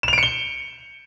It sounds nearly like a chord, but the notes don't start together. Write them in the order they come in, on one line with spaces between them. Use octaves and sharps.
E7 F7 D7 C#7 G7